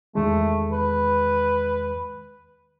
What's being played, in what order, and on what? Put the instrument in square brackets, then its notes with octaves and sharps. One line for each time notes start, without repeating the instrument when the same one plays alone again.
[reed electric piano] E2 D#3 G#3 [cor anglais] A3
[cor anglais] B4